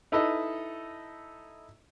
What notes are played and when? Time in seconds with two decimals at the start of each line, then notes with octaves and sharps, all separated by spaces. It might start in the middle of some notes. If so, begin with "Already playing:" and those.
0.12 D#4 E4 A4 B4 D#5